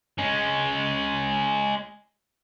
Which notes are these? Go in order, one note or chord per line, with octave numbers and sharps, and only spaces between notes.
G#3 C#4